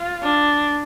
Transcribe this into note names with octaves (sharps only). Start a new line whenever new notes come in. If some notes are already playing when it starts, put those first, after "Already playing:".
Already playing: F4
D4